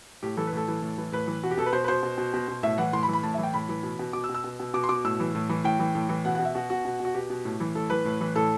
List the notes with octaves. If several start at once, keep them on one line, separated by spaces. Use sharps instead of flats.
A2 G4
E3 A4
B4
A2 A4
E3
A2
E3
A2 B4
E3
B2 F#4
G4
B2 A4
B4
B2 C5
B4
B2 C5
B2
B2
B2
B2
A2 E5
E3 F#5
A2 C6
B5
E3
B5
A2 A5
E5
E3
G5
A2 B5
E3
B2
B2
B2 D6
E6
B2
E6
B2
B2
B2 D6
C6
B2 D6
A2 E6
E3
A2
E3
A2 G5
E3
A2
E3
B2 F#5
F#5
B2
E5
B2 F#4
B2 F#4
B2
B2 F#4
B2 G4
B2
A2
E3
A2 A4
E3 B4
A2
E3
A2 A4